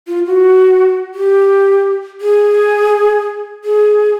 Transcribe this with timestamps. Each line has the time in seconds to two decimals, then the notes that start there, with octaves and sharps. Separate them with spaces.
0.08 F4
0.26 F#4
1.15 G4
2.21 G#4
3.64 G#4